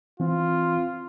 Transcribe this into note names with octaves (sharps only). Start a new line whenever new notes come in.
E3 C4 F4